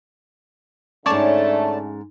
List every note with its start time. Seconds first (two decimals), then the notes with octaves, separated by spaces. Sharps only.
1.06 G#2 D3 A3 C#4 C#5 D5 A5